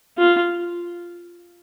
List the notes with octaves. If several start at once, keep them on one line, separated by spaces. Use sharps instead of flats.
F4